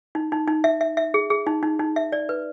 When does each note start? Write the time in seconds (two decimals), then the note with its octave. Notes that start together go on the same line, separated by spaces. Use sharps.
0.15 D#4
0.32 D#4
0.48 D#4
0.64 E5
0.81 E5
0.97 E5
1.14 G#4
1.30 G#4
1.47 D#4
1.63 D#4
1.79 D#4
1.96 E5
2.12 D5
2.29 B4